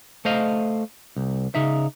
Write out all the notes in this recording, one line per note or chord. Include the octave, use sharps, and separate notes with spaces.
A3 C5 D#5 F5
C2
C#3 D#4 E5